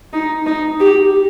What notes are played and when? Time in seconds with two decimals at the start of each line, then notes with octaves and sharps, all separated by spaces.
0.13 D#4
0.46 D#4
0.80 G4